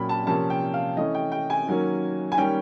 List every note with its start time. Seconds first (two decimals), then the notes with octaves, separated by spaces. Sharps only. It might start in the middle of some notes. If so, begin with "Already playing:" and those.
Already playing: A#2 F#3 A#3 C#4 G5 B5
0.09 A5
0.27 C3 F3 A#3 C#4 A5
0.50 G5
0.74 F5
0.97 E3 A3 C#4 D#5
1.15 G5
1.32 G5
1.50 G#5
1.67 D#3 F#3 A#3 C#4
2.32 G#5
2.38 D#3 G3 A#3 C#4 G5